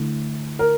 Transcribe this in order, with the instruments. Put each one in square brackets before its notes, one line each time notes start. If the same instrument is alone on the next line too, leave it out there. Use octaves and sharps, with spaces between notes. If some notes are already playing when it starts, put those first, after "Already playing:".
Already playing: [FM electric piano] D3 A3 E4
[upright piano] A#4